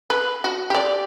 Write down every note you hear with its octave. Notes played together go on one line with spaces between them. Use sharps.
B4
F#4
G4 D5